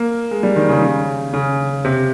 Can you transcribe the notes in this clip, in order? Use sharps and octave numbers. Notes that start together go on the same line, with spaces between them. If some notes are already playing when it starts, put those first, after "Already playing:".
Already playing: A#3
G#3
G3
D#3
C#3
C#3
C#3
C3